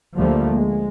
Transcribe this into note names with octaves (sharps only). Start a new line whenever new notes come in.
D2 D3 F3 G3 A3 A#3
G#3